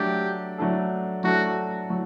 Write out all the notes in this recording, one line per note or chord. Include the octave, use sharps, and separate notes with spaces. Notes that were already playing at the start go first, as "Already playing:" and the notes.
Already playing: F#3 A3 D4 G4 A4
F#3 A3 D4 A4
F#3 A3 D4 F#4 A4
F#3